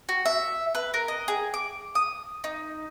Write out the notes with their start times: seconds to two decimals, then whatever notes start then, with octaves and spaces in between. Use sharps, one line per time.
0.09 F#4
0.26 E5
0.75 B4
0.94 A#4
1.08 D#5
1.28 G#4
1.54 D6
1.95 D#6
2.44 D#4